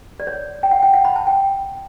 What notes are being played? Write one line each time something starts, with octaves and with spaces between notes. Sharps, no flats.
D5
C#5
G5
F#5
G5
F#5
B5
A5
G5